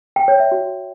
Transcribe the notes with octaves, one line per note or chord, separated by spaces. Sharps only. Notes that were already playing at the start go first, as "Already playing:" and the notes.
G5
C#5
E5
F#4